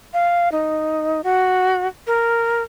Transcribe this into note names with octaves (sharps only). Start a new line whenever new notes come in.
F5
D#4
F#4
A#4